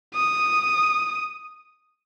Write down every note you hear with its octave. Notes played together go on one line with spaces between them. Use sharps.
D#6